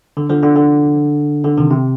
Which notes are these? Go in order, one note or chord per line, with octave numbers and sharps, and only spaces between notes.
D3
D3 F3
D3
D3
D3
C3 D#3
C3